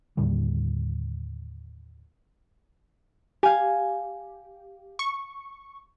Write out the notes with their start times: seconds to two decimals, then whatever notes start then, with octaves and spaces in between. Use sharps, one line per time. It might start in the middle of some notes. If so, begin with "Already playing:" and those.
0.17 D#2 A2 D3 G3
3.43 G4 F5 G#5
4.99 C#6